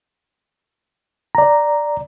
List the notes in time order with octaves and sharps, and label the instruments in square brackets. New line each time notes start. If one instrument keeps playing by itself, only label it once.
[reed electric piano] D5 A#5